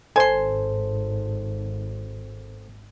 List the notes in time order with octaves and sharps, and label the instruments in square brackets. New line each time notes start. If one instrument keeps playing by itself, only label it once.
[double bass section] G#1 [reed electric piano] A4 C5 [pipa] G#5 C6